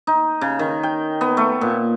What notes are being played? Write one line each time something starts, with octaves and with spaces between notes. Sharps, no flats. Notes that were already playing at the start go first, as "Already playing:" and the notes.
D#4
C#3
D#3
G5
B3
A3
A#2